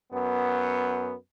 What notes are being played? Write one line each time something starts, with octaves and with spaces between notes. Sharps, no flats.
F#2 B3